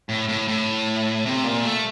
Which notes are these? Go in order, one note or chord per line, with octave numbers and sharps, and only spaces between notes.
A2
A2
A2
C3
A#2
A3